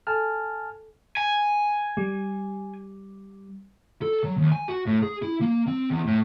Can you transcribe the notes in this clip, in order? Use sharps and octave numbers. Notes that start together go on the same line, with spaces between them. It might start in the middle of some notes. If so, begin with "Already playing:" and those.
A4 G#5 A5 F6
G#5
G3
A4
F#3
D#2
G#5
F#4
A2
G#4
E4
A#3
C4
E2
A2